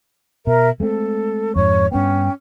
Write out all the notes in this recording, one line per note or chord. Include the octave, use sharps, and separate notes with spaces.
B2 A#4 E5 A#5
G#3 A3 C4 A4
F2 G#2 C#5 C#6
G2 B3 C#4 G5